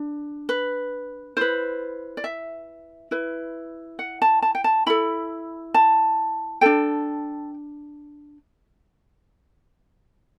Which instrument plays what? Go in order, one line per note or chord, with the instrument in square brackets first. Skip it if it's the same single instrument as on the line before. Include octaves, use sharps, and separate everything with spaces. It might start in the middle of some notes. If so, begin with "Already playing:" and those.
Already playing: [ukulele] D4
B4
E4 B4 C5
D5
E5
E4 B4
F#5
A5
A5
G5
A5
E4 A4 B5
A5
D4 A4 G5